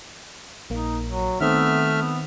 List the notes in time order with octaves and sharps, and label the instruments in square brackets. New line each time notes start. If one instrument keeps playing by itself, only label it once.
[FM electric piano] A#1 A#3 [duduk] D#4
[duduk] F#3
[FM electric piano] D#3 C4 [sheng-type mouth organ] A3 E5 F6 [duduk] B3
[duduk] B3